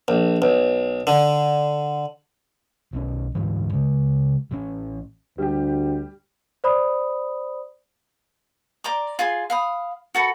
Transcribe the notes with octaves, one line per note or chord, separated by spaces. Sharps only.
A#1
B1
D3
B1 C4 C#4
D2 G#2 E3
C#3 G#3
A1 C#4
D2 G3 G4
C5 D5 B5 D#6
D5 A#5 C6 D6
F4 G#4 C6
F5 B5 D#6
F#4 A4 B5